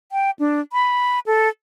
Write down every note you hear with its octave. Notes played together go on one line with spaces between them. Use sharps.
G5
D4
B5
A4